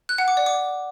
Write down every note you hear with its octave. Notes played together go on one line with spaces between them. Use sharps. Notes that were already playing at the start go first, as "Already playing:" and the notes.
F#6
F#5
D6
D5
D6